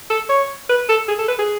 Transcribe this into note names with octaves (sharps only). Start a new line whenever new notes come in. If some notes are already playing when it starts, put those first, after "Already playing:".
A4
C#5
B4
A4
G#4
A4
B4
G#4